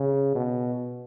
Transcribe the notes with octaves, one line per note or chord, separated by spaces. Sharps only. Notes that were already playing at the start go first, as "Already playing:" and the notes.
Already playing: C#3
B2